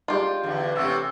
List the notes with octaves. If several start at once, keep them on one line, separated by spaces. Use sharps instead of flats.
G#3 F4 G4 D5
E2 D3
C3 E3 A3 C#4 F#5 E6